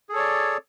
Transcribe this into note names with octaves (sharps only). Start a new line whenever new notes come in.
G#4 A4 C#5 D5